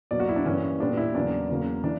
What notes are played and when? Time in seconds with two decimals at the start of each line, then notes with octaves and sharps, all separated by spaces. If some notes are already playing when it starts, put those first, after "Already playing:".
0.11 B2 F#3 A#3 D5
0.20 F#4
0.29 E4
0.36 D4
0.46 G2 E3 A#3 C#4
0.79 A#2 G3 B3 D4
0.97 E4
1.14 E2 C#3 F#3 A#3 D4
1.49 E2 C#3 F#3 A#3
1.84 E3 D4